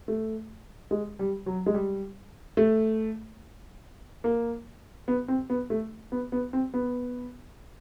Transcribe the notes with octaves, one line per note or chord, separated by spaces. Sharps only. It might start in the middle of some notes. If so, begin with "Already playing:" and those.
A3
G#3
G3
F#3
G#3
G3
A3
A#3
B3
C4
B3
A3
B3
B3
C4
B3